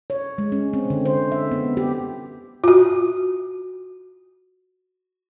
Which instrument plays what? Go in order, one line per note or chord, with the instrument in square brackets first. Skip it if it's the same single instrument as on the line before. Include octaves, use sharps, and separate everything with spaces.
[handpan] C#5
G#3
C#4
C4
D3
C5
E5
B3
G4
[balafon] F4 F#4